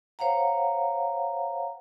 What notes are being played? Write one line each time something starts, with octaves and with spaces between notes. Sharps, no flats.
C5 C#5 F5 F#5 A#5